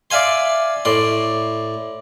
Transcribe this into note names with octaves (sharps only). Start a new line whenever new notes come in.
D5 E5 F5 G#5 C6
A2 D5 C6